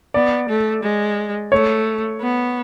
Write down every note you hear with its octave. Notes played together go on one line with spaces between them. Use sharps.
B3 D5
A3
G#3
A3 C#5
B3